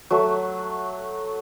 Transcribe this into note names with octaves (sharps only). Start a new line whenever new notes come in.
F#3 A3